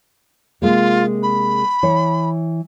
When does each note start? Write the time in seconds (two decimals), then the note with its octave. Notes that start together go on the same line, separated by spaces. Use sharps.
0.62 C3 G#3 A#3 F4
1.23 B5
1.83 E3 C#5